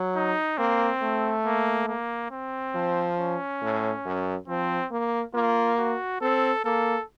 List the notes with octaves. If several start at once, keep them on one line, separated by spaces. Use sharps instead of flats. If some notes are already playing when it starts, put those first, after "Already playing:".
Already playing: F#3
D#4
A#3 C4
A3
A#3
A#3
C4
F3
C#4
A2
F#2
F3 C4
A#3
A#3 F4
F#4
C4 A4
A#3 A4